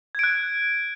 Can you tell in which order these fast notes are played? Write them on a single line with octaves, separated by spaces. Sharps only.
G#6 D7 F#6